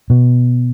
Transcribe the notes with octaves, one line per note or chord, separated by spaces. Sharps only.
B2